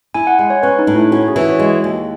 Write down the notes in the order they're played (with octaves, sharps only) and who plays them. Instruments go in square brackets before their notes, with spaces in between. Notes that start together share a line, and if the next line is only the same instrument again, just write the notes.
[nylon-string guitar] E4 [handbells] G#5
[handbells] F#5
[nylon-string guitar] G#3 [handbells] G#5
[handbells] C#5
[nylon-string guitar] C#4 [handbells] B4
[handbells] D#4
[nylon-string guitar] A2
[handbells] E4
[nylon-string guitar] C#4 [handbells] F#4
[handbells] G#4
[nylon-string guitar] E3
[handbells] F#4
C#5
[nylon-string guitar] G#3 [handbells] D#5
[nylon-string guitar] D#2